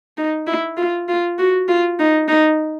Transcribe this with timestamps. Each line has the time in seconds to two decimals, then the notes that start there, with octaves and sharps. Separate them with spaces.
0.17 D#4
0.47 E4
0.77 F4
1.09 F4
1.39 F#4
1.68 F4
1.99 D#4
2.28 D#4